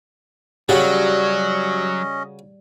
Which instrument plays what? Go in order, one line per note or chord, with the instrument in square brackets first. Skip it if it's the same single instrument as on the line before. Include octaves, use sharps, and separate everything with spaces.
[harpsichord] C#3 F#4 [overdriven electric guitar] F#3 [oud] G3 [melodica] C#4 D#5